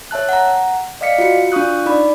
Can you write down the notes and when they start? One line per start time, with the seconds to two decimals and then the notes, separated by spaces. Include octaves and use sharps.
0.11 C#5 E5 A5 F#6
0.29 F#5 A#5
1.01 D5 D#5 F5 B6 C#7
1.18 F4 F#4 C#7
1.52 D4 F4 F5 C#6 D#6 F#6
1.86 D#4 D5 B5